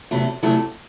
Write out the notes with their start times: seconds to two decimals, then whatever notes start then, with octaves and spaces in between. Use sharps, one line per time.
0.11 E2 C3 F#3 A3 E4
0.43 E2 C3 F#3 A3 E4